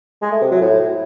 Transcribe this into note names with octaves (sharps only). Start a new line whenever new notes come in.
G#3
A3
C3
F#3
A2